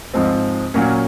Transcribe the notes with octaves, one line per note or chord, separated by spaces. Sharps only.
G#2 F3 G#3 C4
A#2 F#3 A#3 C#4